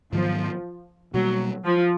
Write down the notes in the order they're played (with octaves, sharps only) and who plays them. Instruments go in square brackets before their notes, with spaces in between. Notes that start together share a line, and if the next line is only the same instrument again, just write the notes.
[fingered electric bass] G#2 D#3 F#3 B3 [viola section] F3
[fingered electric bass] B2 G3 A#3 [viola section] F#3
[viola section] F3